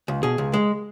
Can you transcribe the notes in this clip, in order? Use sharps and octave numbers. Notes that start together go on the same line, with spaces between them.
C#2
B2 G#4
C#2
G#3